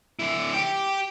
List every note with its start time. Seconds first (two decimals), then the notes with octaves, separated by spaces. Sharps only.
0.19 D3 E4
0.53 G4 G5